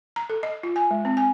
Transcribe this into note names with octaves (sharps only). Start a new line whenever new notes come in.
A#5
A4
D#5
F4
G#5
G#3
C4
G#5